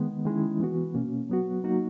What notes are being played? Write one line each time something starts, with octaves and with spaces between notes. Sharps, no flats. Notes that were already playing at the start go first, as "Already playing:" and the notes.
Already playing: D#3 G#3 B3
D#3 G#3 C#4 E4
E3 B3 F#4
B2 A#3 C#4
F#3 B3 F#4
F#3 A#3 D#4 F#4